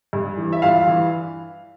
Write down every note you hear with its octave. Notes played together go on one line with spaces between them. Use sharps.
G2
E3
E5
G2 F4 F5
E3